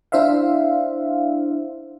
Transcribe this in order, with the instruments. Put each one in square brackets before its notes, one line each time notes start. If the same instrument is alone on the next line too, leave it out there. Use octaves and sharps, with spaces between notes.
[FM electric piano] D4 E4 C5 E5 F5